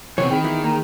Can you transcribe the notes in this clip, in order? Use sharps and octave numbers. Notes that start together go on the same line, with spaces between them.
C3 E3 B3 C4 C#5
D#3 G#4 G5 B5
E3 B3 E4
A#3 A#5